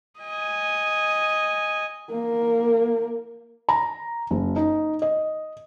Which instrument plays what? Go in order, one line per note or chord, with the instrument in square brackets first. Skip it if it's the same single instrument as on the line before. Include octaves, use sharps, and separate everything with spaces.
[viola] D#5 G#5
[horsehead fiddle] A#3 A#4
[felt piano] A#5
F#1
D#4
D#5